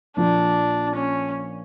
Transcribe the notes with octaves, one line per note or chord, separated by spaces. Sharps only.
A#1 A#2 F3 D4
C#4